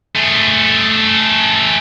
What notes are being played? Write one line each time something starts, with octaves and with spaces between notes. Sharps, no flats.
A3 G#4